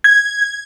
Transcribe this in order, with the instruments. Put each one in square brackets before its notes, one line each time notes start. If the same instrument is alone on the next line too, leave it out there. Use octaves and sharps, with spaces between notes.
[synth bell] G#6